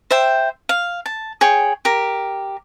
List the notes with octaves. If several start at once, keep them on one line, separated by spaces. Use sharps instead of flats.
C5 E5 G5
F5
A5
G#4 C#5 G5
G4 A#4